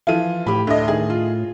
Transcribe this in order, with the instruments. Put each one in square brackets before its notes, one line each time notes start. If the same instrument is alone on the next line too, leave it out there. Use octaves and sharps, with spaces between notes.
[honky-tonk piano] E3 F4 [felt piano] F3 D#7
[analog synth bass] A2 [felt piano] G4 B5
[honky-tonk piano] D2 D#5 [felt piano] D3
[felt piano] D#3 [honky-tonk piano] G#4
[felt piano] F4